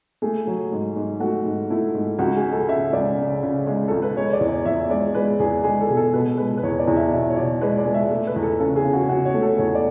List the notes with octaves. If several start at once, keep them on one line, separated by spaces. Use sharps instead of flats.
A3 G#4
F#3
G#2
G#2
A3 F#4
G#2
A3 E4
G#2
C#2 F#4
G#4
G#3
A4
C#3 E5
C#2 D5
C#3
C#3
G#3
C#2 A4
B4
G#3 C#5
D5
E2
D5
E2 E5
G#3 D5
G#3 B4
E2 G#4
G#3 G#4
A4
B2 G#4
A4
B2 B4
G#3 B4
B4
E2 C#5
D5
E2
E5
B2 E5
C#5
B2 D5
G#3 B4
D5
G#3
E5
A3
B4
E2
A4
C#3 A4
G#4
C#3
F#4
C#3 F#4
C#5
A3
A4
E2 C#5
D5